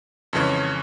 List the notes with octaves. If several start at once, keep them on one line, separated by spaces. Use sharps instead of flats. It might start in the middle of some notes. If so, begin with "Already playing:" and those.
F2 C#3 E3 G#3 C#4